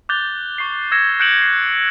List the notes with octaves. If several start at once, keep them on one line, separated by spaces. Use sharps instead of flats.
D6 F#6 G6 A6 F7 G7
C#6 C7
E6 G#6 A#6 C#7 E7
F#6 G6 C#7 D7 E7 F#7
G6 C7